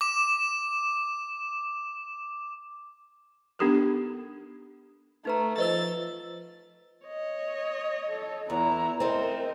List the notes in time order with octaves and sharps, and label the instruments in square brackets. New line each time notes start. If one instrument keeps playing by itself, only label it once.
[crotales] D6 E7
[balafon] B3 D4 D#4 G4 A4 A#4
[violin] A3 [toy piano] D#4 B4 A#5
[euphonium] F3 [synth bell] B4 C5 E6 [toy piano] D#5 [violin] A6
[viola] C#5 D#5
[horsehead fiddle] A4
[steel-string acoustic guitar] E2 [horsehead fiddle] B3 A#5 [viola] E4
[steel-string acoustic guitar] A3 C4 [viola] A#4 C5 [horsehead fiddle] D#5